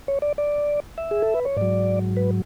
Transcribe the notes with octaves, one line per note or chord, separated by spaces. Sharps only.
C#5
D5
D5
E5
G#4
A4
B4
C#5
G#2 F#3 D5
B4